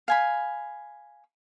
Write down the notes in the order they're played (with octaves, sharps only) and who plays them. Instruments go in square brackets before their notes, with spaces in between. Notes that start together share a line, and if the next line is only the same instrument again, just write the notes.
[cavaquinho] F5 G#5 B5